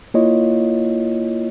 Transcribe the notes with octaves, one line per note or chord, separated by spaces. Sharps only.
A#3 E4 F4 C#5 D#5